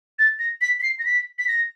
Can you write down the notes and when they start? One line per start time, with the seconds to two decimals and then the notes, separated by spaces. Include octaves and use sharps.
0.19 A6
0.39 A#6
0.61 B6
0.80 B6
0.83 C7
0.99 A#6
1.05 B6
1.39 B6
1.48 A#6